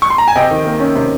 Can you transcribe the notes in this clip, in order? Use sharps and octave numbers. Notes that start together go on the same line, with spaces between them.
C#6
C6
A#5
G#5
C3 D#5 G5
D#3
A#3
C#4
C3